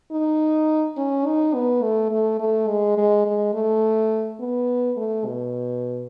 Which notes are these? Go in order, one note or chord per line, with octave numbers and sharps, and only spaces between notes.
D#4
C#4
D#4
B3
A3
A3
A3
G#3
G#3
G#3
A3
B3
A3
B2